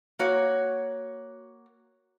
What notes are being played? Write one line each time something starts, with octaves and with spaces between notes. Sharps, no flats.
A#3 F#4 C#5